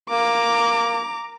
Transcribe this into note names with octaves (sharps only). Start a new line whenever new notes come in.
A#3 A#5 D6